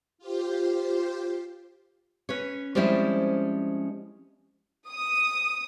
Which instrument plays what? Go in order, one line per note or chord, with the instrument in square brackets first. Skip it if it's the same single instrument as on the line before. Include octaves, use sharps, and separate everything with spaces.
[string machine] F4 G4 C5
[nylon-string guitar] C#4 B4 C#5
F3 G3 G#3 C4 C#4 E4
[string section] D#6